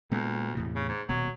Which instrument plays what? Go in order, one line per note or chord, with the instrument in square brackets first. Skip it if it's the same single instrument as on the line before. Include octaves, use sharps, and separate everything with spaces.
[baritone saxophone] D2 [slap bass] A#2 G#3 B3
[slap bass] E2 A2 C3
[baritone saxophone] C#3
G#2
[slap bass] D#1 B2 [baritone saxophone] F#3